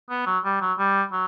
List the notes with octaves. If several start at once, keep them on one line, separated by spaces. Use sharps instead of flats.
B3
F#3
G3
F#3
G3
F#3